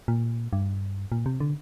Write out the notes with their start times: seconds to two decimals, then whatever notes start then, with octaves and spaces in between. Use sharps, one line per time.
0.08 A#2
0.53 G2
1.12 A#2
1.26 C3
1.40 D3